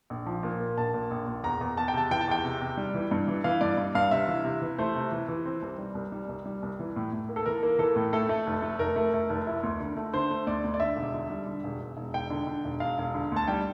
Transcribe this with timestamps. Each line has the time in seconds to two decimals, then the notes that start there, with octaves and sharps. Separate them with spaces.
0.10 A#1
0.26 F3
0.43 A#2
0.60 A#3
0.78 A#1 A5
0.94 A#2
1.11 A#1
1.27 A#2
1.43 E2 A#5
1.61 E2
1.77 E2 A5
1.88 G5
1.94 C3 A5
2.11 E3 G5
2.21 A5
2.28 E2 G5
2.44 C3
2.61 C3
2.78 G3
2.94 E3
3.11 G2
3.28 E3
3.44 E3 F5
3.61 G2 D5
3.77 G2
3.95 G2 F5
4.11 C3 E5
4.28 E3
4.44 C3
4.62 E3
4.78 A3 C5
4.95 C3
5.12 E3
5.28 E3
5.45 C4
5.62 C2
5.78 G3
5.95 C2
6.12 G3
6.29 C2
6.46 G3
6.63 C2
6.79 E3
6.96 A2
7.12 A2
7.29 A#3
7.36 A4
7.46 E3 A#4
7.63 A#3
7.79 E3 A4
7.96 A2
8.13 A3 A4
8.29 A3
8.47 F1
8.62 A3
8.79 F1 A#4
8.96 A3
9.14 A3
9.30 F1
9.47 E4
9.63 D2
9.80 D3
9.97 A3
10.14 D3 C5
10.31 A3
10.47 D2 D5
10.64 D2
10.74 D5
10.80 D3 E5
10.97 E1
11.14 D3
11.30 G3
11.47 D3
11.64 E1
11.81 E1
11.97 E1
12.14 E1 G5
12.30 D3
12.47 D3
12.65 E1
12.80 E1 F5
12.98 E1
13.14 D3
13.32 D2 A5
13.48 G3 G5